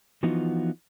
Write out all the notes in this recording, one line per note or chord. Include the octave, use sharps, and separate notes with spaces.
E3 F3 B3 D#4 F4 F#4